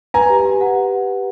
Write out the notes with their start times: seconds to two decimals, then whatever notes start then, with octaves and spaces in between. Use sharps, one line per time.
0.14 B4 G#5 A#5
0.30 G4
0.45 G4
0.61 F#5